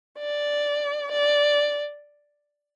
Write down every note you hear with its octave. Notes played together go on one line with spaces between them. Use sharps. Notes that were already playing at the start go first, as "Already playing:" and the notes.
D5
D5